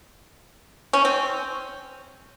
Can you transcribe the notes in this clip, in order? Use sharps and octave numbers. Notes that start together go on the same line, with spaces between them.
C#4
C4